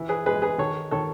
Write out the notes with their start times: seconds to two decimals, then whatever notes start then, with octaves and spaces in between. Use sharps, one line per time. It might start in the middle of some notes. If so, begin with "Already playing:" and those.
Already playing: E3
0.09 G#4 B4
0.26 G#3 G#4 B4
0.42 G#4 B4
0.58 D#3 A4 C#5
0.91 D#3 A4 C#5